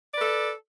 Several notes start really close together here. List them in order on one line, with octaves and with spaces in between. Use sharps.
D5 B4 A4